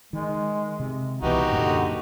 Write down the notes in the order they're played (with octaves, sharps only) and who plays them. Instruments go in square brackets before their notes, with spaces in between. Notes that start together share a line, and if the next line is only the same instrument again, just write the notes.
[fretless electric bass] D#3 [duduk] G#3
[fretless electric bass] C3
[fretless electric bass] C2 B2 [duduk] E3 [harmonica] D#4 F#4 G4
[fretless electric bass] F#2 A#2 A#3 [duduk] D3